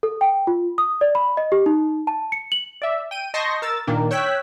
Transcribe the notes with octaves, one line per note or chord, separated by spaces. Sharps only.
A4
G5
F4
D#6
D5
B5
D#5
G4
D#4
A5
C#7
F#7
D5 E5
G5 D#7
D#5 A5 C6 C#6 G6 A#6
A#4 E6 A6
A#2 D#3 A#3 D4
C#5 G5 E6 F#6 G#6 B6